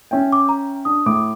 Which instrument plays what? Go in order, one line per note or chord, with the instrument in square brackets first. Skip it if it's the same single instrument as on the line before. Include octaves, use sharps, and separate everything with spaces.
[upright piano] C#4 E5 G5
[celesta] D6
A#5
[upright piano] D4 [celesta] D#6
[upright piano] A2 D6